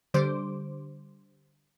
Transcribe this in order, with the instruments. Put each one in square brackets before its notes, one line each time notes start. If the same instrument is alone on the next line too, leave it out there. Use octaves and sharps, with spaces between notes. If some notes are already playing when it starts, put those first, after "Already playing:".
[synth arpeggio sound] D3 G3 C5 D6